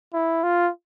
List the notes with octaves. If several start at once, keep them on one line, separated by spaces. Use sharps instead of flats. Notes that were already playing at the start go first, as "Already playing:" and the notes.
E4
F4